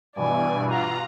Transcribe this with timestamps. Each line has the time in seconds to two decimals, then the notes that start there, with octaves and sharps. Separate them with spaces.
0.16 G2 B2 E3 D5 G#5
0.70 F4 F#5 A#5